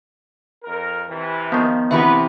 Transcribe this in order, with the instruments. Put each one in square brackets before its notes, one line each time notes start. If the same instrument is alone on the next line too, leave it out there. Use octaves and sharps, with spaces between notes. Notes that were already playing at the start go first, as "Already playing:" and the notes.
[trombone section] F2 A#4
C3 E3
[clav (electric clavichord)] D#3 F3 [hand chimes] B3
[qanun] C3 E3 C#6 [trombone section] B3 B4 [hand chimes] E5 B5